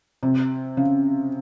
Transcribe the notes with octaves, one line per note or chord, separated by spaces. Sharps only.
C3
C#3